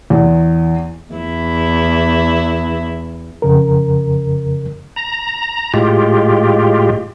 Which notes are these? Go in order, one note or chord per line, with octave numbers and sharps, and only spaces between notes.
E2
E2 E4
F2 C#3 A#4
A#5
A2 G#3 F4 G4